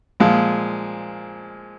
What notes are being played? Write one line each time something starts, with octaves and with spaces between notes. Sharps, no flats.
A#2 F3 G#3